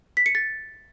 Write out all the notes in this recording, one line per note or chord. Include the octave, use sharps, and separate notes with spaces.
B6
C#7
A6